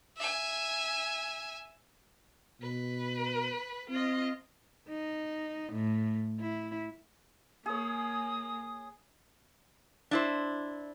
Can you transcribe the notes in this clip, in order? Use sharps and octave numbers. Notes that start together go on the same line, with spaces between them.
E5 G#5
B2 B4
C4 F4 D#5
D#4
A2
E4
A#3 G#4 C#5 D#6
D4 E4 C5